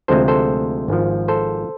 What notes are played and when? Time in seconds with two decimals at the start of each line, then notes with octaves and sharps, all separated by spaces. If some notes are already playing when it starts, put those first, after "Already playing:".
0.08 D2 C3 F3 G#3 C4 A4 C5
0.28 A4 C5
0.88 G#1 G#2 F3
1.28 A4 C5